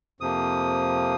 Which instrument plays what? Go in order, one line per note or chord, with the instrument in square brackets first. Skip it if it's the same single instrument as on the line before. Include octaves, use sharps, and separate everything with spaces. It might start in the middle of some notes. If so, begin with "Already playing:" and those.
[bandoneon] F2 C3 F3 A#3 D#6